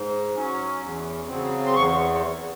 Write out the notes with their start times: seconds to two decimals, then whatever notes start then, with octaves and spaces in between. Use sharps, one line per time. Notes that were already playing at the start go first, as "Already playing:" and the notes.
Already playing: G#2
0.35 F#3 C#4
0.82 E2
1.28 C#3 F#3 C4
1.66 C6
1.75 E2 C#6